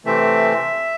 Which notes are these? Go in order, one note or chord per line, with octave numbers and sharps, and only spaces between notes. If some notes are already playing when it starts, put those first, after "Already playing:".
C3 E3 A3 C4 E5